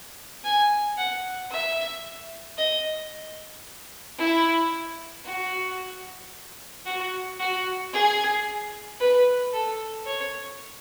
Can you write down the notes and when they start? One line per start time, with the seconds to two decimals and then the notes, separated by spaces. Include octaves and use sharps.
0.44 G#5
0.97 F#5
1.51 E5
2.58 D#5
4.18 E4
5.25 F#4
6.86 F#4
7.39 F#4
7.93 G#4
9.00 B4
9.53 A4
10.06 C#5